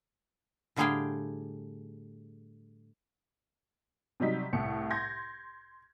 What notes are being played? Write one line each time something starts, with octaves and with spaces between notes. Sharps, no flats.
A2 D3 G3 G#4 F5 G5
C3 F#3 G3 D#4 B6
C2 A2 C#7
C6 G6 G#6 A#6